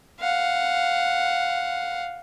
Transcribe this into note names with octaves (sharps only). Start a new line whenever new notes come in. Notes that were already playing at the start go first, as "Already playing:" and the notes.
F5 F#5